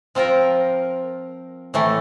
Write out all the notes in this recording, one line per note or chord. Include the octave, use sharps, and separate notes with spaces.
F3 C4 F4 A#4
A2 E3 A3